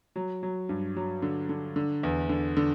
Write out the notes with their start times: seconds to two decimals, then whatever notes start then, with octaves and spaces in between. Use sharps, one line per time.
0.16 F#3
0.43 F#3
0.69 G2
0.96 F#3
1.22 D3
1.49 D3
1.76 D3
2.03 E2
2.29 D3
2.57 D3